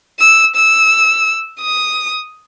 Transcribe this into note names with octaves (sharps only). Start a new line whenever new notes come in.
E6
E6
D#6